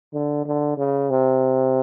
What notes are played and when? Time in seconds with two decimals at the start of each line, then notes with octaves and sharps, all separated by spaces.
0.13 D3
0.46 D3
0.78 C#3
1.10 C3